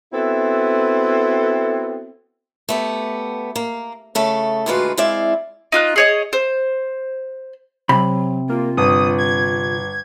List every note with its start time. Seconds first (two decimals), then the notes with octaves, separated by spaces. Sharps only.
0.13 B3 C4 E4 F#4 A4
2.69 A3 B3 G4
3.56 A#3
4.15 C#3 A3 A4
4.66 D2 A#2 G#3 F4 F#4 B4
4.97 G#3 C4 E4 D5 E5 F5
5.72 D#4 F4 F#6
5.96 G#4 C#5 D#5
6.33 C5
7.89 C3 F#3 B5
8.49 A#3 F4
8.77 G1 D#6
9.18 G#6